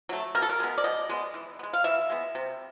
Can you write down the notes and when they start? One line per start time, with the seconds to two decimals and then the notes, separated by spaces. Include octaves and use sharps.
0.09 F#3 A3
0.35 B2 A#4
0.42 A4
0.49 A#4
0.60 G#3 B3
0.78 D5
0.84 B2 D#5
1.09 G#3 B3
1.34 E3
1.59 B3
1.63 G#3
1.73 F5
1.84 E3 E5
2.10 G#3 B3
2.35 C3